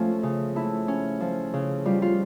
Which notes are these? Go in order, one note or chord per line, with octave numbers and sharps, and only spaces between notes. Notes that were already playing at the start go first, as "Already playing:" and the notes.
Already playing: F3 A3 C#4 F4
C#3
A3 E4
C#4
F3
C#3
G3 F4
F4